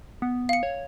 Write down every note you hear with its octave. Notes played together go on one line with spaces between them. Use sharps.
B3
F5 C#7
C#5